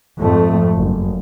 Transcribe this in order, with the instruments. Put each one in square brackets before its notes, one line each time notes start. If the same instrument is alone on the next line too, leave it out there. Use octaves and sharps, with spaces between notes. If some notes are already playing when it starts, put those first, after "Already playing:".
[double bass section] F2 G#2 A3
F#1